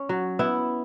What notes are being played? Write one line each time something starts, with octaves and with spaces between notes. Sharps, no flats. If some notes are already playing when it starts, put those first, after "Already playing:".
Already playing: C#4
F#3
B3 E4